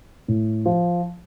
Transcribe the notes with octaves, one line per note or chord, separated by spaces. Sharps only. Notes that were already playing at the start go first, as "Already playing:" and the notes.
A2
F3